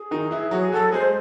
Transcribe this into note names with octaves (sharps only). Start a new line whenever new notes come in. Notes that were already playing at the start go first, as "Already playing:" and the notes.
Already playing: G#4
D#3 D#4
E3 E4
F#3 F#4
G#4
F#3 F#4 A4
G#3 G#4 C5